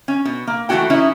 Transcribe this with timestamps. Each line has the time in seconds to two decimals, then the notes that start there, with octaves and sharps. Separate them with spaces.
0.08 C#4
0.25 B2
0.47 A#3
0.69 E3 A3 C4 D4 F#4 G5
0.90 E3 C#4 D#4 E4